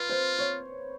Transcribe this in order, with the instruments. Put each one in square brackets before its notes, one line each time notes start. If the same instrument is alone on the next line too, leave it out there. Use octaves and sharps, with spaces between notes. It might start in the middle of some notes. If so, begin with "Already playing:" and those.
Already playing: [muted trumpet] F4 [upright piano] B4
[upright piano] C5
C#5